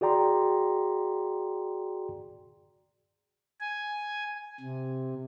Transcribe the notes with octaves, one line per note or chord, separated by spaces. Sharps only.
F#4 G#4 D5 G5 A#5 C6
G#5
C3